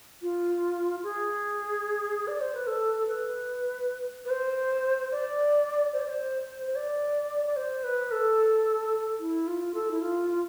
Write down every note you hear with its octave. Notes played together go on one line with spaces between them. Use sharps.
F4
G#4
D5
C5
B4
A4
B4
B4
C5
D5
C5
D5
C5
C5
D5
D5
C5
B4
A4
E4
F4
A4
E4
F4